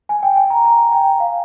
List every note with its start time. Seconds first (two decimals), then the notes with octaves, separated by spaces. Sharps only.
0.09 G#5
0.23 G5
0.36 G#5
0.50 A#5
0.65 A#5
0.92 G5
1.20 F5